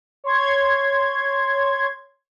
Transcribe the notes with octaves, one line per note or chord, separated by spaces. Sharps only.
C#5 C6 G#6